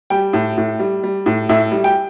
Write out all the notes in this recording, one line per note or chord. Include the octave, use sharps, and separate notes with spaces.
G3 G5
A2
A2
G3
G3
A2
A2 E5
G3
G5